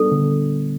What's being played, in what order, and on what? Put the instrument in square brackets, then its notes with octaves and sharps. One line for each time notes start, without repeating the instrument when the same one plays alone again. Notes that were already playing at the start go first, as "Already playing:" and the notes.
Already playing: [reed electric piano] G3 B3 D4 [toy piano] A4
[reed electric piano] D3